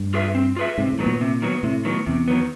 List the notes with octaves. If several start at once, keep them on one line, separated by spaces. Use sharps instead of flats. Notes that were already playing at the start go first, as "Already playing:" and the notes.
Already playing: G2
F4 G#4 B4 E5
C4
F4 G#4 B4 E5
G#2 C3
A2
D#3 F#3 B3
A#2
C3
D#3 F#3 B3
A2 C3
D#3 F#3 B3
E2 C3
D#3 F#3 B3